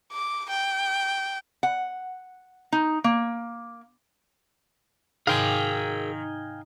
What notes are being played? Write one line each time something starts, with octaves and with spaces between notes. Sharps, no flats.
D6
G5
F#5
D#4
A#3
G#2 C3 D#3 G#4 A#4 F5 G5 G#5